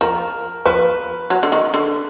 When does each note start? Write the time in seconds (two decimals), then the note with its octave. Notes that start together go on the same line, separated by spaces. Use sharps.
0.01 F3 A#4
0.65 F3 B4
1.30 F#3
1.43 D3
1.52 D#3
1.74 D3